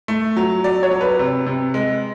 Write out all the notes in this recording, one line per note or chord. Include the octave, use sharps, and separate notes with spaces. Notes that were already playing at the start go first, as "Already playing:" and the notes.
A3
F#3
F#3 D5
C#5
F#3
B4
C3
C3
G#3